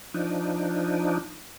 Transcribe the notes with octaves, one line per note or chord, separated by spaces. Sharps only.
F3 D4 D#4